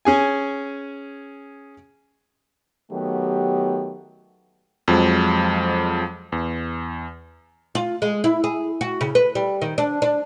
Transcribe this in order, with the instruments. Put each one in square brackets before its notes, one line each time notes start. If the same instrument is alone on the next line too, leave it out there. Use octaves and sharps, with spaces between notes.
[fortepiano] C#4 G#4 G#5
[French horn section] D#3 F#3 A3 B3 G4
[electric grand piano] F2 F3 F#3 G#3
E2
[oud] F4
G#3
E4
G#4
F#4
C#3
B4
G3
D#3
D4
D4